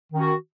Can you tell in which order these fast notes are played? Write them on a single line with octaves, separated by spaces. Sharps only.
D#3 C#4 F#4